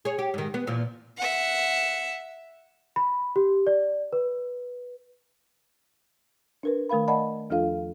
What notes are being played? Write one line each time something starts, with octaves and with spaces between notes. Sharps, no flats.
G#4 C#5
G4
G#2 D#3
B3
E2 A#2 F3
E5 F#5
B5
G4
D5
B4
D4 A#4 B4
D#3 A3 A#4 F5 B5
D5 D#5 F#5 A5 B5
E2 F3 D4 F4 A4 F5